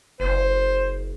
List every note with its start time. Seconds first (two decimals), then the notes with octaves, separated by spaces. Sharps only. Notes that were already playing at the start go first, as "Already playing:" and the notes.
0.20 F#1 C5